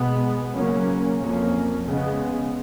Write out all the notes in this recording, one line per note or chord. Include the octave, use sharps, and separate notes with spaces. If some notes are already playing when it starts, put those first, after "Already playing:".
Already playing: B2 G#3 B3
C#3 F#3 A#3 C#4
F2 F3 A#3 C#4
C#3 G#3 B3